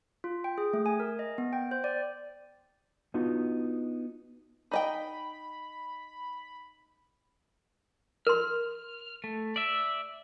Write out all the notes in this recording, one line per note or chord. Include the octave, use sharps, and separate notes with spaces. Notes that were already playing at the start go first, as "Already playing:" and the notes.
F4
G5
G#4
A3
G#5
A#4
D#5
B3
G5
C5
D5
B3 D4 D#4 F4 F#4
D#4 D#5 G5 B5
A#4 C6 F6
A3
D5 E5